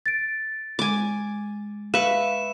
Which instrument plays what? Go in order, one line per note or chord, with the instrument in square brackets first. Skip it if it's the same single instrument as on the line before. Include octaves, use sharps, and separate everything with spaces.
[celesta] A6 D7
[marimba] G#3 [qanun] G#5 D6
[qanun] B4 E5 C#6 [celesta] F5 [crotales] E7